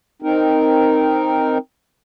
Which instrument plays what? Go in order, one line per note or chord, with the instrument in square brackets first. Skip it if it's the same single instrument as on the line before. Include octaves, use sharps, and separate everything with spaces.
[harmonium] C4 D#4 A#4